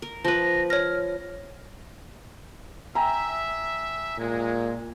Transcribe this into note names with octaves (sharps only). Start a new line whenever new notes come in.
A#4
F3 B4 A#6
C#5 F6 A#6
E5 G5 G#5 A#5
A#2 G#3